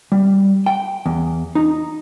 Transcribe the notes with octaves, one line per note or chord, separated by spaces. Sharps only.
G3
G5
E2
D#4